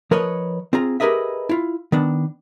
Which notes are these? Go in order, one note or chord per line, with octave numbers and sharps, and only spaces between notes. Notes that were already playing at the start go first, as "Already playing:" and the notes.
F3 A#4 B4 C#5 D#5
C4 F4 G#4 A#5
G4 G#4 A#4 B4 D#5 E5
E4 F4
D#3 B3 D4